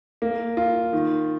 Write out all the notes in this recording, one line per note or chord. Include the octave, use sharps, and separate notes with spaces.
A#3
F4
D#3